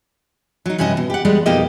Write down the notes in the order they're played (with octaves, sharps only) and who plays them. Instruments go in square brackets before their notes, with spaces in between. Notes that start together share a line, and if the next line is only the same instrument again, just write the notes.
[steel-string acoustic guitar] F#3 D#4
G2 C3 C#4 E4 A#4 D#5
B2
G4 F#5
G3 G#3 B3
F2 B2 A#3 D#4 G4 D#5